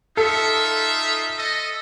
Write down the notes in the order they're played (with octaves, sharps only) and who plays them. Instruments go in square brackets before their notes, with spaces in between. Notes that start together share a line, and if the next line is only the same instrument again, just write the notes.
[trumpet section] D#4 F4 E5 [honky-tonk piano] A4
[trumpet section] A4 D#5